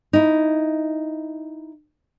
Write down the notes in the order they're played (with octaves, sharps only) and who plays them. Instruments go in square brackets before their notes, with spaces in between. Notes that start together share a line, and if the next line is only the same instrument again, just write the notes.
[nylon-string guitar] D#4 E4